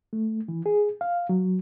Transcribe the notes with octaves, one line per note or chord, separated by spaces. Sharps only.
A3
E3
G#4
F5
F#3